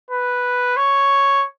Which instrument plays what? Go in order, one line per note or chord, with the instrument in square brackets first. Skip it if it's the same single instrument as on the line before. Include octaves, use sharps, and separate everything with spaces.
[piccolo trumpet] B4
C#5